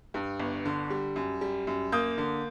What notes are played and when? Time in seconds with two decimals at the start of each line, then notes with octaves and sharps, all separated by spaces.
0.14 G2
0.39 G1
0.65 D3
0.90 G3
1.16 F#2
1.41 G3
1.67 F#2
1.92 A#3 D#6 G6
2.18 D3